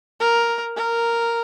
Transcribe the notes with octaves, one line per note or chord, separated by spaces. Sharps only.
A#4
A#4